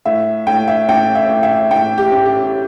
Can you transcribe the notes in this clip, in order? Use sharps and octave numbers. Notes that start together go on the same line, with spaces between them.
A2 E5
A2 G5
E5
A1 G5
E5
A1
E5
A2 G5
G4
A1
G4